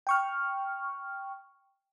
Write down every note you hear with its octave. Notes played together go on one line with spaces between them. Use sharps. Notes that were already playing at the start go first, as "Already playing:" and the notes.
G5 C#6 F6